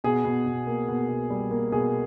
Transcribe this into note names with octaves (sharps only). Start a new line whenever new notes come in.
B2 G#4
B2
B2
A#3
B2
B2
G3
A#3
B2 G#4